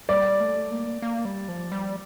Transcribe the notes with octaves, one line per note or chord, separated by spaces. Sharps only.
G3 D5
A3
A#3
A#3
G3
F3
G3